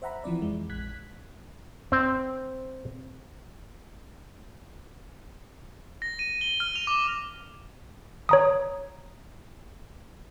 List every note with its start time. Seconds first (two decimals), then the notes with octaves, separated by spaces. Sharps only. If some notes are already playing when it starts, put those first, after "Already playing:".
0.02 C5 E5 F#5 A#5 B5
0.24 E3 F3 C4 D5
0.42 F2 G#3
0.69 A#1 F#6 G#6 B6
1.92 C4
6.02 A#6
6.19 D#7
6.41 G7
6.60 F6
6.75 F7
6.87 D6
8.29 C#5 A#5 D#6